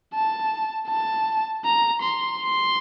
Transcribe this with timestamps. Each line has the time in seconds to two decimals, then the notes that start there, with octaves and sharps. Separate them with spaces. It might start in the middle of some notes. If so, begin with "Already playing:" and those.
0.14 A5
0.89 A5
1.65 A#5
2.02 C6
2.40 C6